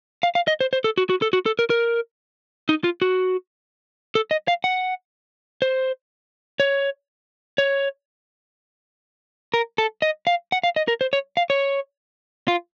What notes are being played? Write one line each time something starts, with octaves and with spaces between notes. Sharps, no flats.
F5
F5
D#5
C5
C5
A4
F#4
F#4
A4
F#4
A4
A#4
A#4
D#4
F4
F#4
A4
D#5
F5
F#5
C5
C#5
C#5
A#4
A4
D#5
F5
F#5
F5
D#5
A#4
C5
C#5
F5
C#5
F4